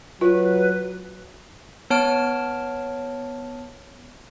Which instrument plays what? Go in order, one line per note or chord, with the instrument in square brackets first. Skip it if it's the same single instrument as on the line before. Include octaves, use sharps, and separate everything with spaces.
[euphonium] F#3 [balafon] F4 [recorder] B4
[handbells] B3 C#5 A5 F6 D7